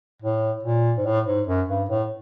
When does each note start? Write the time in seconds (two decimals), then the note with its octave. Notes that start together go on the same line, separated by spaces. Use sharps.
0.22 A2
0.63 A#2
0.98 G#2
1.06 A2
1.27 G#2
1.47 F#2
1.69 G2
1.89 A2